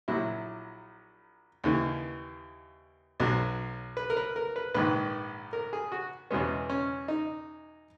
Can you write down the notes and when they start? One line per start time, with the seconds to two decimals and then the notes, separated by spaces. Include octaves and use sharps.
0.08 A#1 A#2 F#3 E4
1.64 D#2 C#3 E3
3.20 B1 B2 F#3
3.97 B4
4.10 A#4
4.17 B4
4.36 A#4
4.56 B4
4.74 A#1 G#2 D#3 B4
5.53 A#4
5.73 G#4
5.92 F#4
6.31 E2 B2 G#3 B3 C#4
6.70 C#4
7.08 D#4